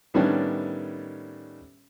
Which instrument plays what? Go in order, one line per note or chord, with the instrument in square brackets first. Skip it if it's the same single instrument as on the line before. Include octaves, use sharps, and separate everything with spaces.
[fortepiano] A2 D#3 G3 B3 C#4 D4